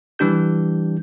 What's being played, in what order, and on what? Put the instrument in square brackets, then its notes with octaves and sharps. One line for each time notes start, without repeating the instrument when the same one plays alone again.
[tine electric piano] E3 G3 D4 G4 G6